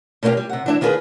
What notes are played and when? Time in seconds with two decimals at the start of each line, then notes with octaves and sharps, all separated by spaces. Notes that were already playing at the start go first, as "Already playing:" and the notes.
0.23 B2 A#3 C4 D#4 F4 G4
0.37 G3
0.49 C3 F#5
0.66 E3 F#3 D4 E4
0.81 D#3 B3 F4 G4 G#4 B4